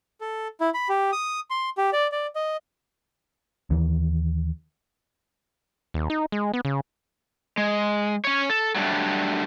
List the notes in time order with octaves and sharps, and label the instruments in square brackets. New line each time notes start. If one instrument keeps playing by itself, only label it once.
[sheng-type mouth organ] A4
E4
B5
G4
D#6
C6
G4
D5
D5
D#5
[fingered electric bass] D#2 E3
[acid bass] D#2
D#4
G#3
B3
C#3
[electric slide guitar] G#3
C#4 C#5
A4
F#3 G3 A3 D4